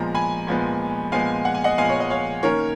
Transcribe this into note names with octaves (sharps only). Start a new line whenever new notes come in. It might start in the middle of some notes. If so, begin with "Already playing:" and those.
Already playing: A#2 F3 G#3 B3 A#5
G#5 B5
A#2 F3 G#3 B3
A#2 F3 G#3 B3 F5 G#5
F#5
G#5
D#5 F#5
A#2 F3 G#3 B3 F5 G#5
C#5
D#5
C#5 F5
D#3 A#3 C#4 A#4 C#5